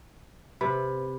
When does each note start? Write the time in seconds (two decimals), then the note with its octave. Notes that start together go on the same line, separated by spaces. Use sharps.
0.61 C3 B4 C5 B5